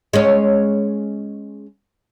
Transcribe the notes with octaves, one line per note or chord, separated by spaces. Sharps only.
G#3 C#4